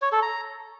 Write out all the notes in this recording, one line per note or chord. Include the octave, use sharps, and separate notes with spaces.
C#5
A4
A#5